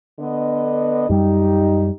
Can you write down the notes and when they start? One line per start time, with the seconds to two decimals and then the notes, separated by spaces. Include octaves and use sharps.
0.20 D3 B3 D#5
1.09 F#2 G3 D#4 G4